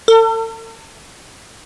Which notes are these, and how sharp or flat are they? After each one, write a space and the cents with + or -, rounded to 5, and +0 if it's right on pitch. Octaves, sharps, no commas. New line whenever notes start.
A4 +40